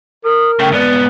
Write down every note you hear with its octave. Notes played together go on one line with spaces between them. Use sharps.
A#4 D#6
C#3 A3 G5
G#2 B3 D5